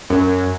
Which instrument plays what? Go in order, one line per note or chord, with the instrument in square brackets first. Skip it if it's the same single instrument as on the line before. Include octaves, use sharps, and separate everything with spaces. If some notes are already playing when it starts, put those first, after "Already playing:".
[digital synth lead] F#2